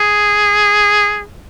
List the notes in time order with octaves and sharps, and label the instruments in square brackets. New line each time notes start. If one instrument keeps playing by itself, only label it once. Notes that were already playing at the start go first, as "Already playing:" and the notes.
Already playing: [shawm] G#4